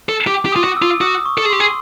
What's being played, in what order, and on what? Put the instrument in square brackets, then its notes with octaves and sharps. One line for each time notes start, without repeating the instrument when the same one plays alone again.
[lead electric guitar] A4
[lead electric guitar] G4 [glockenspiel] D6
[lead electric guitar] G4
[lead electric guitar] F4 [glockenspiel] D#6
[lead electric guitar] F#4
[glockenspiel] E6
[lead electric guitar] F4
[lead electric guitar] F#4 [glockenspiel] D#6
[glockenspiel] C#6
[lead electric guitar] A4
G#4
[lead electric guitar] G4 [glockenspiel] C6
[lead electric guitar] G#4